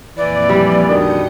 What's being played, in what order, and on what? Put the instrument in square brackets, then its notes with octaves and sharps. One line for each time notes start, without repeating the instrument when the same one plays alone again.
[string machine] F2 A#2 [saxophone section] E3 [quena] D5
[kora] G3
[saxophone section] B2 D3 D#3 [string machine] D#6 G6 C#7